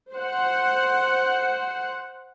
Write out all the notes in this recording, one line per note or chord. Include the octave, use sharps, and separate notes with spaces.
C5 F#5